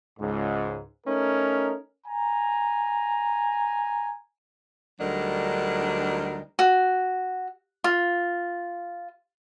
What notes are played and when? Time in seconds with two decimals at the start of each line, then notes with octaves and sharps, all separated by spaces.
0.19 C#2 G#2
1.06 A3 C#4 D#4 A#4
2.06 G#5 A#5
5.00 D2 F#3 G3 D4 D#4 A#4
6.59 F#4
7.84 F4